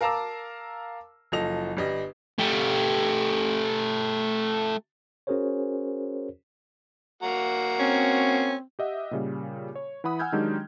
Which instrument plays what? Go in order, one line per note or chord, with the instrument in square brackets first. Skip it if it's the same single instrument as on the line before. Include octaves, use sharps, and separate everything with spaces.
[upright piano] A#4 F5 A5 A#5 D6 E6
F#1 F3 A4 D#5 F7
G1 G3 D#5
[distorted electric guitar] A3 G4
[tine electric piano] C#4 F#4 G#4 A#4 C5 C#5
[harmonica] A#3 F#4 A#5
[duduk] C4 [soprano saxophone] C#4
[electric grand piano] G4 D#5 E5 F#5
A#2 C#3 G3
C#5
E3 E4 F#5 B5 D#6
F#5 G#5 E6 F6 G6 G#6
D#3 F#3 G#3 D4 D#4 G4